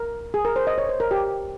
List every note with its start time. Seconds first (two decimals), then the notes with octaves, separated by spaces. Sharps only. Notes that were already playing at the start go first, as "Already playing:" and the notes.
Already playing: A#4
0.34 G#4
0.45 A#4
0.56 C5
0.67 D#5
0.78 C#5
0.89 C5
1.00 A#4
1.11 G4